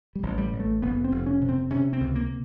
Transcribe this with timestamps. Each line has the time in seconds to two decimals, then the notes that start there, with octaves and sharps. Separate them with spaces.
0.15 G3
0.23 A1
0.37 G3
0.52 A1
0.60 A3
0.82 F1 B3
1.04 C4
1.12 F1
1.26 C#4
1.41 C3
1.49 C4
1.70 C3 C#4
1.93 C4
2.00 C#2
2.15 A#3